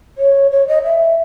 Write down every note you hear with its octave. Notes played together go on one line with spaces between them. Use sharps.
C#5
C#5
D#5
E5